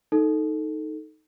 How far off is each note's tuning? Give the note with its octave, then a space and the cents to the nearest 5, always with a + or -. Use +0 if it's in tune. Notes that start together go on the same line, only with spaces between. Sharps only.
D#4 +0 A4 +0